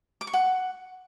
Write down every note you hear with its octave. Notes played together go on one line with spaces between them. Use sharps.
D6
C#6
F#5